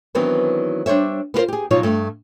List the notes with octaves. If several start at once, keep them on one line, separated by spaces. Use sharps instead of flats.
D#3 E3 F#3 B3 C4 D4
G3 D4 C5 C#5 E5
B3 F4 A#4 C5
G4 G#4
B2 F3 F#3 D#4 F4 C#5
G2 A3